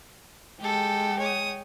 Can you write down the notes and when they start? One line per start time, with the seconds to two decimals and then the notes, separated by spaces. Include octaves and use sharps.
0.60 G#3 G4 A4 G5
1.19 C#5 D#6